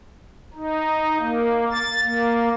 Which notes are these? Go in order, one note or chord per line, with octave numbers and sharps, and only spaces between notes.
D#4
A#3
A6
A#3